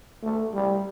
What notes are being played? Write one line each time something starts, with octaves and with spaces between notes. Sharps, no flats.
A3
G3